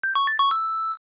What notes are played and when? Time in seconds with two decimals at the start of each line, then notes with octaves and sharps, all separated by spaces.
0.04 G6
0.15 C#6
0.27 A6
0.39 C#6
0.51 E6